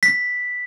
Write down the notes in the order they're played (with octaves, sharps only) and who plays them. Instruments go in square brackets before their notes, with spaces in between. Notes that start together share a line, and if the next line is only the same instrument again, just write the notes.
[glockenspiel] B6